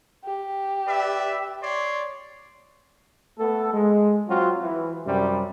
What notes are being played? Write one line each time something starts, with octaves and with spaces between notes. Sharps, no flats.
G4
B4 D5 E5
C#5 D5 C6
A3 B3 A4
G#3
F#3 C4 F4 F#4
E3
F#2 C3 G3